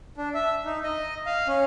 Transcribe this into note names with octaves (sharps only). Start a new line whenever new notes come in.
D4
E5
D#4
D#5
F5
C#4